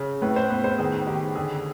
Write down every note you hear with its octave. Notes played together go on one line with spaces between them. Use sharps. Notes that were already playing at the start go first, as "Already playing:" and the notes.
Already playing: C#3
A2 B4
C5
B3
C5
D#3 G#4
D#3 G4
D3 G#4